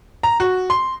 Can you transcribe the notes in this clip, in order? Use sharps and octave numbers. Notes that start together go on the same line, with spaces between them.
A#5
F#4
C6